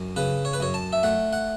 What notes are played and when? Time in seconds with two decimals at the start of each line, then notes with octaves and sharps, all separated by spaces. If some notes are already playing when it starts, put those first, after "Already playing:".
Already playing: F#2
0.16 C#3 B4
0.45 C#5
0.53 B4
0.60 F#2 C#5
0.74 A5
0.93 E5
1.03 A3 F#5
1.33 F#5